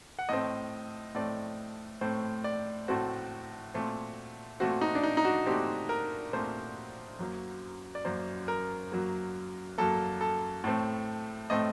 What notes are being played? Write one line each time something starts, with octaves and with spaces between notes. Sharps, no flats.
F#5
A2 A3 C4 D#5
A2 A3 C4 D5
A2 A3 C4 C5
D5
A2 A3 C4 F#4
A#2 A3 C4
A#2 A3 C4 F#4
D#4
D4
D#4
D#4
F#4
A#2 A3 C4 G4
A#4
A#2 A3 C4 C5
F#2 F#3 A#3
D5
F#2 F#3 A#3 C5
A#4
F#2 F#3 A#3
F#2 F#3 A#3 A4
A4
A2 A3 C4
A2 A3 C4 D#5